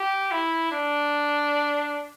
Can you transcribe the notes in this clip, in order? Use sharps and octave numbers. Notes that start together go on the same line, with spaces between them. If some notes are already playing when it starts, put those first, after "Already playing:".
Already playing: G4
E4
D4